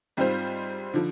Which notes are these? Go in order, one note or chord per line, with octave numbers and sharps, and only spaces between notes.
G#2 G3 C4 F4 C5
D3 F3